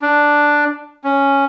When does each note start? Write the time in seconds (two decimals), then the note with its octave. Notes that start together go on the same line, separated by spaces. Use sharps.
0.02 D4
1.04 C#4